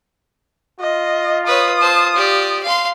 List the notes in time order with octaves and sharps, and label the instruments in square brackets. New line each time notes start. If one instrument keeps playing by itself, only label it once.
[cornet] F4 [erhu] D#5
[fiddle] B4 C#5 [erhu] D#6
[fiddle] C5 A5
G4 D5
F5 C6